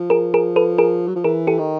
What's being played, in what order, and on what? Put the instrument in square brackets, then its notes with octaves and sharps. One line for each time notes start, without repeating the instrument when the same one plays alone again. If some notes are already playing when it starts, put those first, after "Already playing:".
Already playing: [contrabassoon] F3
[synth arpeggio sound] G#4 A#4
G#4 A#4
A4 B4
G#4 A#4
[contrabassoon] F#3
F3
[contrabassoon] E3 [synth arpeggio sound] G#4 A#4
[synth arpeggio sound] G4 A4
[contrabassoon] D#3